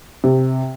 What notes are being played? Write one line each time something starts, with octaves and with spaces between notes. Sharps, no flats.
C3